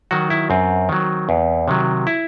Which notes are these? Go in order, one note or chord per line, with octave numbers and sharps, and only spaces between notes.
D#3 F#3 F#4
E4
F#2 C4
D#3 F#3
E2
C3 D#3 F#3
E4